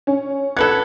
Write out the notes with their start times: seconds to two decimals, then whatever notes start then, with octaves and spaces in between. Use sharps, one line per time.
0.07 C#4
0.57 A4 B4 F#5 F#6 G#6